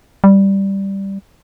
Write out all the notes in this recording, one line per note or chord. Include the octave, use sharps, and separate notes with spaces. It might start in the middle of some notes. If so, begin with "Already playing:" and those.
G3